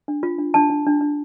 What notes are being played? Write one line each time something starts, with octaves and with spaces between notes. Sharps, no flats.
D4
F4
D4
D4 A5
D4
D4
D4